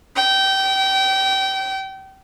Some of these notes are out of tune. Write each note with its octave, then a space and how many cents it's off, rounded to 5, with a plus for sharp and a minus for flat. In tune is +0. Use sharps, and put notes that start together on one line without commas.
G5 -25